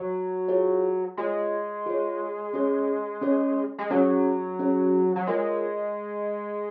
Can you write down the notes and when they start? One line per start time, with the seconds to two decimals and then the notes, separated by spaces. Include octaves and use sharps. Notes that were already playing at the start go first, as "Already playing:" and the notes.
Already playing: F#3
0.48 F4 G#4 C#5
1.17 G#3 F4 G#4 C#5
1.86 F4 G#4 C#5
2.53 C#4 G#4 C#5
3.21 C#4 G#4 C#5
3.78 G#3
3.90 F#3 C#4 G#4 C#5
4.59 C#4 G#4 C#5
5.16 F#3
5.27 G#3 F4 A#4 C#5